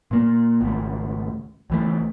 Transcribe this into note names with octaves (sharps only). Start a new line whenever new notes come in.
A#2 A#3
G#1 C#2 A3
C#2 E3 A3